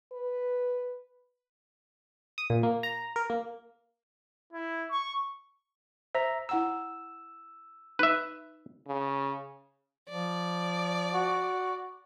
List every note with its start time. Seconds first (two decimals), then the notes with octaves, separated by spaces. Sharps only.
0.13 B4
2.38 D#6
2.50 A#2
2.63 A#3
2.83 A#5
3.16 A#4
3.30 A#3
4.53 E4
4.91 C#6
6.15 C5 E5 A#5
6.49 E4 F#5 A#5 E6
7.99 D#4 B4 E5
8.88 C#3
10.10 F3 D5
11.14 F#4